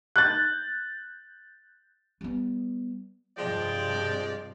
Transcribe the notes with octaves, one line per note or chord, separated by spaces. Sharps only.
F#6 G6 A6
G3 B3
G2 C3 F3 G#3 D5 G5